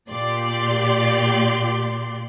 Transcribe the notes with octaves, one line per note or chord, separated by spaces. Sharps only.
A#2 G4 D5 C6